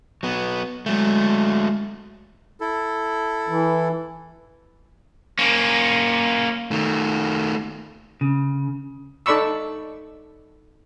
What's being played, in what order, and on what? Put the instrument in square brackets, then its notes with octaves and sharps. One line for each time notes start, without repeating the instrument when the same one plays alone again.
[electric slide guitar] F#3 B3
[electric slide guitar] F#3 A3 [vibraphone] G#3
[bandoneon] E4 A4
[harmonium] E3
[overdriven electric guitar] A#3 C#4
[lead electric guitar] D#3 A3
[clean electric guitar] C#3
[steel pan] D#4 A4 D5 B5 C#6 E6